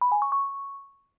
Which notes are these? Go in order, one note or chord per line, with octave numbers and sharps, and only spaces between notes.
B5
G#5
C#6
C#6